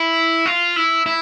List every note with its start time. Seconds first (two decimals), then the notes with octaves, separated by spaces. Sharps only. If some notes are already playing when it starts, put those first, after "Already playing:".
Already playing: E4
0.46 F4
0.76 E4
1.06 E4